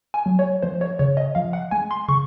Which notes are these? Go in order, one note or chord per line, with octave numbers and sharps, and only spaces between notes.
G#5
F#3
C#5
F3 C5
C#5
C#3 C#5
D#5
F3 F5
F#5
G#3 G#5
C6
C#3 C#6